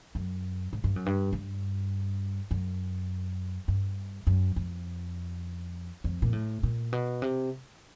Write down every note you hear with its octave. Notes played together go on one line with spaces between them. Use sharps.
F#2
G#2
G2
F#2
G2
G2
F#2
G2
F#2
F2
F2
A#2
A2
A#2
B2
C3